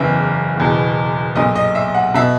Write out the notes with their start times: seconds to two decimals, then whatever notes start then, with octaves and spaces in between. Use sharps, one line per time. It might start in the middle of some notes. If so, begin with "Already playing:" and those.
Already playing: F#1 E2 C#3 E3 E5
0.57 F#1 E2 B2
1.36 B1 A#2 D#5
1.55 D#5
1.75 E5
1.94 F#5
2.14 B2 E5